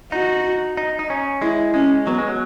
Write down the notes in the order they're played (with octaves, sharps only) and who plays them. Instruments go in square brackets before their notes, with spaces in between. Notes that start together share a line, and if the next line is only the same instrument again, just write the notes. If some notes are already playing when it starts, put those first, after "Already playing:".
[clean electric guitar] D#4 [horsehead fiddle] F#4
[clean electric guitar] D#4
D#4
C#4
[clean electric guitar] G#3 [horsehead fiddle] E4
[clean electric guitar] G#3 [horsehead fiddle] C#4
[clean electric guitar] F#3 [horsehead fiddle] B3
[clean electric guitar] G#3
F#3